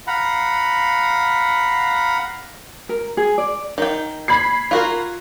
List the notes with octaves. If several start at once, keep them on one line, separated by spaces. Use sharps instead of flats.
F5 F#5 A#5 B5
A#4
G#4
D5
D#3 G5
B5 G#6 C7
F4 F#4 A#4